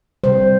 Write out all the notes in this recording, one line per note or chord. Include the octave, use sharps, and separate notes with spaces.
C3 G3 C5